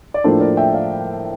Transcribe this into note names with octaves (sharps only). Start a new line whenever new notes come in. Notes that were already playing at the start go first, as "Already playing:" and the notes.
D5
A2 F3 A#3 D4 A4 C5
A#4 D5
E5 G5
D5 F5